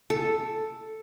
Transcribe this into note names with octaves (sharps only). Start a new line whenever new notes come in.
A4